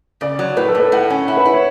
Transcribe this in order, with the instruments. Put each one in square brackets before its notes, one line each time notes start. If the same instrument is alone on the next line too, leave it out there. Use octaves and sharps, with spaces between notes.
[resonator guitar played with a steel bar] C#3 [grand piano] D5
[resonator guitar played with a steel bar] F#3
[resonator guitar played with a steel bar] A2 [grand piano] B4
[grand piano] A4
[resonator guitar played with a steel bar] A2
[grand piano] B4
[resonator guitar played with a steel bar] A2 [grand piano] F#5
[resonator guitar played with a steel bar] C#4
[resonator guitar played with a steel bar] E4 [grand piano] F#5
[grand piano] B4
[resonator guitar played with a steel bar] E4
[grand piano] C#5